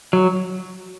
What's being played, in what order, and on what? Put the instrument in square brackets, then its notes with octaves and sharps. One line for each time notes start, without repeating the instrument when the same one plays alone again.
[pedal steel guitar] F#3